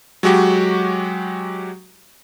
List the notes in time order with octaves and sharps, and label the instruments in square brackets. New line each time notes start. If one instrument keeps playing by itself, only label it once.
[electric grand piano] F#3 G#3 F#4 G4